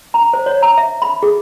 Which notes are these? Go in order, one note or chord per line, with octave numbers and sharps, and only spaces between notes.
A#5
C5
C#5
A#5
E5
B5
G#4